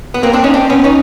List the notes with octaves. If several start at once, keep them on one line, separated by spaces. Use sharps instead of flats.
B3
A#3 C4
C4 D4
C#4 D#4
C4 D4
B3 C#4
C#4 D#4